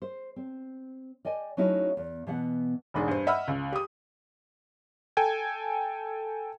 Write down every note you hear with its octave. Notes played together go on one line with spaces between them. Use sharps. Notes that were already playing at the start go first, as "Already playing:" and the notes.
C5
C4
D5 D#5 G5 G#5
F#3 A3 C#4 D#4 E4 F#4
E2
B2 E3 B3 F#5
E1 G#2 D4 G#4
G2 C5
D#5 E5 F#5 B5 E6 F6
C#2
G4 D#6
A4 G5 G#5 G#6